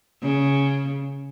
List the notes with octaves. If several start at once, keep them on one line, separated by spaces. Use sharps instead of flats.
C#3